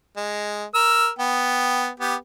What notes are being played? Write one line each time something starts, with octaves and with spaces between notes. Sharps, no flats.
G#3
A#4 E6
B3 G5
B3 G4